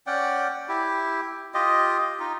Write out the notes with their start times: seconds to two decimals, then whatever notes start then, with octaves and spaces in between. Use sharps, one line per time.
0.07 C#4 D5 F#5 G5
0.68 E4 G4
1.54 F4 G4 D#5
2.20 D#4 F4